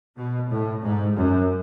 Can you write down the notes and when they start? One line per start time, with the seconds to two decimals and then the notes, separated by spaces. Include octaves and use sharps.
0.17 B2
0.51 A2
0.82 G#2
1.16 F#2